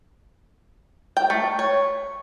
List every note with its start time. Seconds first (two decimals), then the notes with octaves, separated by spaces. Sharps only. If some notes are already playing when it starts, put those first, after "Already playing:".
1.17 G5
1.30 A3
1.59 C#5